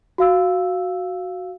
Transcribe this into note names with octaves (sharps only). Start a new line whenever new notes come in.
F#4 F5 E6